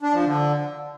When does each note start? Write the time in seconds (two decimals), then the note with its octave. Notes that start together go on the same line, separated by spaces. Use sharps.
0.02 D4
0.13 F3
0.25 D3